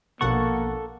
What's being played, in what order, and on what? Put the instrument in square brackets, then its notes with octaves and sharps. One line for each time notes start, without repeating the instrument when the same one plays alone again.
[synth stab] A#1 B2 F#5 [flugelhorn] A#3 [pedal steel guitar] A4 C#6